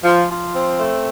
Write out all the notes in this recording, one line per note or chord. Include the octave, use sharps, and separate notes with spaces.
F3
F3
C4
A3